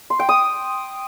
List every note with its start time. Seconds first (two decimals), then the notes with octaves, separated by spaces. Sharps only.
0.10 C6
0.19 G5
0.29 D#6